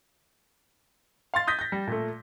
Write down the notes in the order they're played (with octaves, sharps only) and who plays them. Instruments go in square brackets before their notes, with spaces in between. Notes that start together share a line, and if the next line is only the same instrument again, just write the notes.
[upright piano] F5 C6 A6
D#6 G6 A#6 B6
G6 A#6
G3
A#2 A3